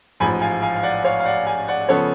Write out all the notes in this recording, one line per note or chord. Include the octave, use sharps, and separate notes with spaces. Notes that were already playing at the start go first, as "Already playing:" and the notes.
A1 G#2 F3 G#5 B5
F5 G#5
F5 G#5
F5
D5 F#5
C#5 F5
F5
D5 F#5
F5 G#5
D5 F#5
C#3 F3 B3 A4 C#5